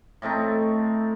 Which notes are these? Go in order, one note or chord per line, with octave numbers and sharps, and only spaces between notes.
A2 A3 C4 D#4